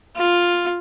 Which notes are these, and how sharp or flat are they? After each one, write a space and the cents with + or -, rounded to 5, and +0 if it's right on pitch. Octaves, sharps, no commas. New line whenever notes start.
F4 +5